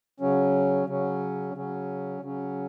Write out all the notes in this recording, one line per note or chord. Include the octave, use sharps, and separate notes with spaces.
C#3 F#3 C#4
C#3 F#3 C#4
C#3 F#3 C#4
C#3 F#3 C#4